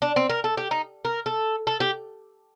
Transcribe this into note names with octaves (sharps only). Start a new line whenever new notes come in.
D4
C4
A#4
A4
G4
D#4
A#4
A4
A4
G4